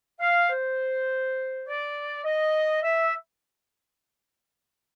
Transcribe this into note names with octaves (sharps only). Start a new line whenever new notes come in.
F5
C5
D5
D#5
E5